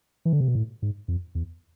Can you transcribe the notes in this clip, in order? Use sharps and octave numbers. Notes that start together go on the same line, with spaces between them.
E3
D3
C3
B2
A2
G#2
F2
E2